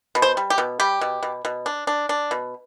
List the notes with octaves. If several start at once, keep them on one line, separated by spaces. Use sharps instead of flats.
B2
C5
G3
G4
B2
G3 G4
B2
B2
B2
D4
D4
D4
B2